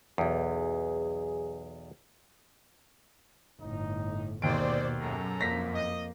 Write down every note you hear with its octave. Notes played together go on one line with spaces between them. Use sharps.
B1 E2 G#4
G1 A2 D#4
D#2 B2 B3 C4 G#4 C5 D5 D7
F#2 G#4 A4 A#5
F2 A#3 A#6 B6
D#5